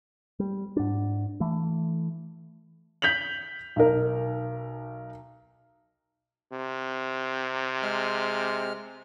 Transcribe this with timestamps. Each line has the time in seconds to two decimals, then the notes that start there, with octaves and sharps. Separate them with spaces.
0.40 G3
0.77 G#2 D4
1.40 E3 A3
3.02 G6 B6 F7 F#7
3.76 B1 D#4 A#4
6.52 C3
7.82 G#3 F6